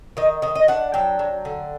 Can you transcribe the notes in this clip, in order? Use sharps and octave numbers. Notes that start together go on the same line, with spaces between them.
D#3 D#5
D#3 D#5
D#5
D4 F#5
F#3 G5
F#3
D3